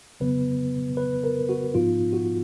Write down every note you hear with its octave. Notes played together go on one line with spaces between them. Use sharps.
F2 C#3 F#3 B3 B4
B4
A#4
F#4
G#2 F3 B3 D#4 F4
F#4